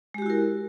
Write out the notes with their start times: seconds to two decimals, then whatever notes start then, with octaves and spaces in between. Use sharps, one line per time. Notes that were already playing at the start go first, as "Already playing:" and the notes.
0.14 G#3
0.18 G4
0.22 F#4
0.26 E4
0.30 A#4